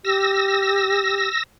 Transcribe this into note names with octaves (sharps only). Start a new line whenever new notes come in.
G4 E6 A#6